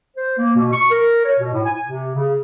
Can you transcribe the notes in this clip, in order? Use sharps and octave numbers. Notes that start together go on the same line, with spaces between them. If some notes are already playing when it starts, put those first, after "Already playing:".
C5
A#3
B2
C#6
A#4
C#5
B2
A2
G#5
C3
C#3